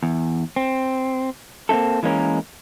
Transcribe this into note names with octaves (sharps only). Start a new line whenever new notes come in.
E2
C4
A#3 C4 D#4 E4 A4
E3 G#3 A#3 C#4 A#4